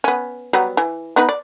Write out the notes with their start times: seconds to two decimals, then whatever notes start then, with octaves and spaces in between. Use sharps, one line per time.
0.04 B3 C#4
0.53 F#3 G3 B3
0.77 E3
1.16 B3 D#4 B4
1.29 D5